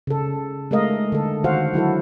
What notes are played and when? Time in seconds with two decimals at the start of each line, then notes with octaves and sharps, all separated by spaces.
0.07 C#3 A4
0.71 G#3 A3 A#4 D#5 F5
1.12 D3 A4
1.44 D#3 F#4 C5 F5 F#5
1.73 F#3 E4 F#4 A4